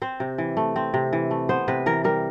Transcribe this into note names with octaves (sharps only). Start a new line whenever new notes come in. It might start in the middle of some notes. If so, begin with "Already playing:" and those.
C4 C5
C3
E3
A3
C4
C3
E3
A3
B3 C5
C3 B4
E3 A#4
G3 A#4